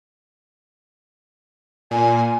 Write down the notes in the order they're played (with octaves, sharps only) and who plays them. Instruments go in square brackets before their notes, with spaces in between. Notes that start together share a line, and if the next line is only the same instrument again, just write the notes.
[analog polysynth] A#2 [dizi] G#5